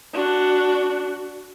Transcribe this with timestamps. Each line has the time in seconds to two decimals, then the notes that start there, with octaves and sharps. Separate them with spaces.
0.13 D4 F#4